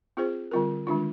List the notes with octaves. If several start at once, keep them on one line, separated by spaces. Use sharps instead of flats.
C4 F4 G#4 C5
D3 G3 C4 F4 A#4
D#3 G#3 D4 F4